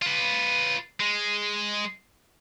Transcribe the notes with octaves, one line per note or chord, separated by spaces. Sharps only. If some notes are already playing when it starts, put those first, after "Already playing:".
F4 B4
G#3